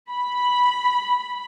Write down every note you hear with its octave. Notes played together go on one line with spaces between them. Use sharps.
B5